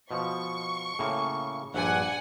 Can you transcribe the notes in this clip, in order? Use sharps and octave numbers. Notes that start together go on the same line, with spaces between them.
B2 F3 C#6
A2 C#3 A#3
A#1 G2 D5 F#5 G#5